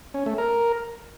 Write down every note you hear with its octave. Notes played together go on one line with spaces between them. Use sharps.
C#4
A3
A#4